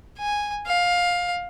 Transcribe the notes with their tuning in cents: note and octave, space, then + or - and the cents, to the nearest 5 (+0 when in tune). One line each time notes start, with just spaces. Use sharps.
G#5 -5
F5 +15